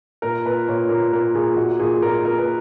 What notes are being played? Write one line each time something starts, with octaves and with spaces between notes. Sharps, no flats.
A#2 A#4
A#2 B4
A#2 C#5
A#2 A#4
A#2 A#4
A#2 G#4
A#2 F#4
A#2 G#4
A#2 A#4
A#2 A#4
B4